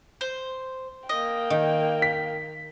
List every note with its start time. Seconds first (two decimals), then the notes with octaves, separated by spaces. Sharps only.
0.21 C5
1.09 A#3 D#5 G5
1.50 D#3
2.02 B6